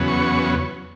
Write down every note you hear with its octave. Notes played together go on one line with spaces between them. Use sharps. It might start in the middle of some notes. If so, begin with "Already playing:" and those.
Already playing: E2 C#3 F#3 B3
C#6